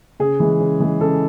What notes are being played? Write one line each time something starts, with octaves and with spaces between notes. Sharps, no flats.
C#3 G#4
E3 G#3
C#3
E3 G#3
C#3 A4